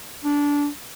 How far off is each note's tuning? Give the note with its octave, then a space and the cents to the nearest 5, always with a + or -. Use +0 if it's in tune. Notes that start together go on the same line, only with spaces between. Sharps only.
D4 -20